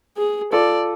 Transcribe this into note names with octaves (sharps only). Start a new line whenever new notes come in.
G#4
F4 A4 D5